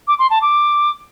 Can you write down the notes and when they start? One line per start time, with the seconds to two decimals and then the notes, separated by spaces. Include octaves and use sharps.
0.08 D6
0.19 C6
0.30 A5
0.42 D6